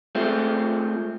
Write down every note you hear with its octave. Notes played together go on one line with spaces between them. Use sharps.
G#3 A3 C4 F4